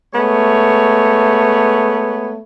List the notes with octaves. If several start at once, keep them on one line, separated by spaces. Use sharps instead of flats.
G#3 A3 B3 C#5